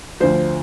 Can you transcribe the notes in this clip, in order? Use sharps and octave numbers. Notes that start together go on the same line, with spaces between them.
D2 D3 F3 C5